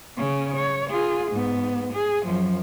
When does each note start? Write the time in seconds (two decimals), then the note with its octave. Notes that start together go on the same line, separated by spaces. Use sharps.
0.17 C#3 C#4
0.56 C#5
0.90 F4 G#4
1.31 G#2 B3
1.93 G#4
2.25 F#2 F3